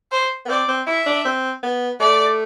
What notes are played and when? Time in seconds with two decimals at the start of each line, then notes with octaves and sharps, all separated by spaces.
0.12 C5
0.45 B3
0.49 C4 D5
0.68 C4
0.87 E4 E5
1.06 D4
1.25 C4
1.63 B3
2.00 A3 D5